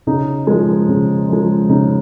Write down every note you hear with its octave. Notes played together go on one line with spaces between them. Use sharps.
C#3 D#4
F3 G#3
C#3
F3 G#3
C#3 D#4